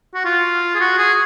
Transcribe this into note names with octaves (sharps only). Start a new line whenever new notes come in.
F#4
F4
G#4
F#4
G#4